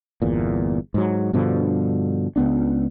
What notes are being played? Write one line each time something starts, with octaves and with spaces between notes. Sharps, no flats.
G1 E2 A#2
G#2 F#3
G2 B2 D3 F3
C#2 B3 D4